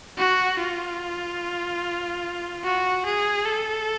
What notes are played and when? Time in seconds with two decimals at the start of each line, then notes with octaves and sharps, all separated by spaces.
0.18 F#4
0.60 F4
2.64 F#4
3.06 G#4
3.46 A4